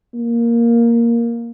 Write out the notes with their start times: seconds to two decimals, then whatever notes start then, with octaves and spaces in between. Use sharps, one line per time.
0.15 A#3